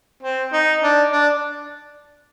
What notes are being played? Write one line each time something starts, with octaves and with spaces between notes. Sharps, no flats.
C4
D#4
D4
D4